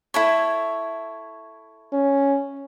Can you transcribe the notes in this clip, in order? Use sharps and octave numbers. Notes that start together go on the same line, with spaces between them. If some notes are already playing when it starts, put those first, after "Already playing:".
E4 A4 C#5
C#4